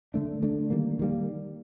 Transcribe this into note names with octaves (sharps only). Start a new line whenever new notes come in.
D3 A3 D4
D3 A3 D4
D#3 G3 A#3
D#3 G3 A#3